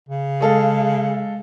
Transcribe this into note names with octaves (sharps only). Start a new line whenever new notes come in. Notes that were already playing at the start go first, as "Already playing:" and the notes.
C#3
G#3 A4 F5